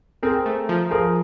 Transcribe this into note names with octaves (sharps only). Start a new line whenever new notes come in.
C4 G#4 A#4
A3
F3
F3 G#4 A#4